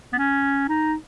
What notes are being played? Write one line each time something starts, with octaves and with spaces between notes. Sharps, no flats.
B3
C#4
D#4